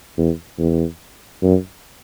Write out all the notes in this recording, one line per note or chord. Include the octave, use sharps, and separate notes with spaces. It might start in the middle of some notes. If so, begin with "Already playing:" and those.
E2
E2
F#2